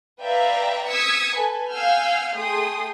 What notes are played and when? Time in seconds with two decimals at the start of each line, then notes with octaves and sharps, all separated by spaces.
0.21 B4 D5 E5 F5 G5 A#5
0.90 D#6 E6 G#6 B6 C#7
1.36 A4 B4 G#5
1.70 F5 F#5 G#5 E6 F6 G6
2.36 A3 G#4 G5 C6 D#6